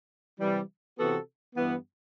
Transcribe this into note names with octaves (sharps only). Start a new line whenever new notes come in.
C3 E3 G3
C3 E3 B3 F#4 A4
G2 E3 B3